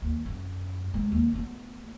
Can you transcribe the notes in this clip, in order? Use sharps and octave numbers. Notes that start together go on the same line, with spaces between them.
D#2
F#2
E3 G#3
D#2
A3 B3